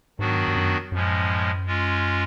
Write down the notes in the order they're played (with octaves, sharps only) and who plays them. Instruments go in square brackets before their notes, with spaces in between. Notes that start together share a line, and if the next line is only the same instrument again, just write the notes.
[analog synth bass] G#2 [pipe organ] D#3 F#3 B3 D4 F#4
[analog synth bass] G2
G2
F#2
[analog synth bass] F#2 [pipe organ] A2 F3 G#3 C#4
[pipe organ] G#3 C#4 F4